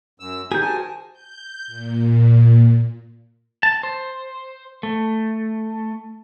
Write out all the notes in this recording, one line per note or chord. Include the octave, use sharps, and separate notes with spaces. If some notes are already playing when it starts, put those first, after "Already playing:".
F#2 E6
D#3 C4 D#4 G4 G#4 G6
F#4 A#4 C5 G#5 A5
G6
A#2
A5
C5
A3